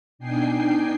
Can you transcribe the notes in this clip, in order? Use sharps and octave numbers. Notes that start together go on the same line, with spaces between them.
B2 D4 D#4 G5 G#5 C7